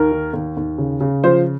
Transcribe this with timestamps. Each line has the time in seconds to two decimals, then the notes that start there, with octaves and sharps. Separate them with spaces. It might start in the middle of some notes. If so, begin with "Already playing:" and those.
Already playing: D#2 A#4
0.12 D#3
0.34 D#2
0.57 D#2
0.78 C#3
1.01 C#3
1.24 F3 C5